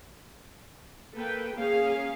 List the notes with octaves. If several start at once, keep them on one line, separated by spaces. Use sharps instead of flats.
A#3 A4 B4 G5
A#3 C#4 G#4 F5